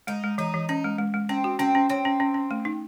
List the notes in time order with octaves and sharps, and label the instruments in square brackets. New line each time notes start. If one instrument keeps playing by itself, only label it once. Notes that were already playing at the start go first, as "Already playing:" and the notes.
[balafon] G#3 [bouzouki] D#4
[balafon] G#3
[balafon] E3 [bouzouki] D#4
[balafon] E3
[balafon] C#4 [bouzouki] D#4
[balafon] G#3
G#3
G#3
[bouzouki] C4 [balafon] C#4
[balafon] F#4
[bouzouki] C4 [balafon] C#4
[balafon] C#4
[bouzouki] C4 [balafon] C#5
[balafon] C#4
C#4
C#4
A3
D#4